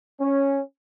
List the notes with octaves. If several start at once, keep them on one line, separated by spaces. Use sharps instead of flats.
C#4